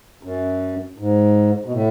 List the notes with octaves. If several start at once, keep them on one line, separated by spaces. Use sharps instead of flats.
F#2
G#2
B2
A2